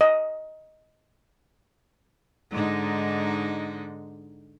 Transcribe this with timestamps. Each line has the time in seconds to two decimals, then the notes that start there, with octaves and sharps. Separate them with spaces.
0.01 D#5
2.51 G#2 D3 D#4